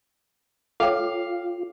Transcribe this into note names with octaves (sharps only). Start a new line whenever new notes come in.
F4 A4 C#5 F5 G5 D6